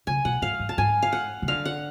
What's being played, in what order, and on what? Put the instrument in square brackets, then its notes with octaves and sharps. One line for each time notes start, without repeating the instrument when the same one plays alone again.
[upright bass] C#3 [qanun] G#5
[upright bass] B2 [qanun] F#5
[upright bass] G#2 [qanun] F5
[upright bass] G#2
[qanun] A5
[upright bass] G#2 [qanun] G#5
[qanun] F5
F#5
[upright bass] C#3
[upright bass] D3 [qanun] F5
[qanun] F#5